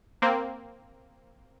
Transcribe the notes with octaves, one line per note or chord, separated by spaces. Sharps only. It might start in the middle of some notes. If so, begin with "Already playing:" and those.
A#3 C4